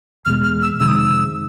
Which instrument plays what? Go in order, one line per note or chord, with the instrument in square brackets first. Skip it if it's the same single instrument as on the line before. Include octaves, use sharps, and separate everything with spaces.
[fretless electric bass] E2 B2 G#3 [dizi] F6
[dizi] F6
E6
[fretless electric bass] F2 C3 D#3 G#3 [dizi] E6
[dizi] D#6
E6